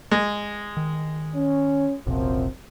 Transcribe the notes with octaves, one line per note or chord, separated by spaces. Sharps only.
G#3
D#3
C#4
E1 A#1 F#2 C3 F3 C4